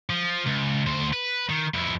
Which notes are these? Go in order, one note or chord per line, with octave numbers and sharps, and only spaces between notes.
F3
C#2
D2 C5
B4
D#3
F2 E4